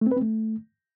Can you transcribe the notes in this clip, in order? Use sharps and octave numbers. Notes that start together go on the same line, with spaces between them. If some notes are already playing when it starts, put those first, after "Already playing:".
A3
C4
B4
C4
A3